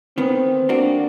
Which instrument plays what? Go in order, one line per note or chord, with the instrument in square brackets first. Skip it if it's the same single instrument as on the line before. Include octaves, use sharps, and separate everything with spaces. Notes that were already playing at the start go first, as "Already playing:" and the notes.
[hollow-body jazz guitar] D#3 B3 [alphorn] C4
[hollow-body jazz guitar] A#3 D4 F#4